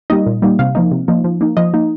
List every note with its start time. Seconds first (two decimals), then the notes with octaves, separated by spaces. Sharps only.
0.10 G3 A#3 D#4 D#5
0.26 A#2
0.42 G3 A#3 D#4
0.59 C3 F5
0.75 F3 A#3 D#4
0.92 C3
1.08 F3 A#3 D#4
1.24 F3
1.41 A#3 D#4
1.57 F3 D#5
1.74 A#3 D#4